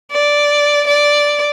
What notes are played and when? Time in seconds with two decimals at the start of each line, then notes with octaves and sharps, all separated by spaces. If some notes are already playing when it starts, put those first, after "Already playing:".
0.12 D5
0.87 D5